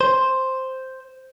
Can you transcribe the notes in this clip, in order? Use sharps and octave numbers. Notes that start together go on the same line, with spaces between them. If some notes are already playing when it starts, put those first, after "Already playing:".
C5